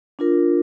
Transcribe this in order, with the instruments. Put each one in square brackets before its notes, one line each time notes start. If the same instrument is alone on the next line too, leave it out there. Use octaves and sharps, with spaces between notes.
[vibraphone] D4 F4 A#4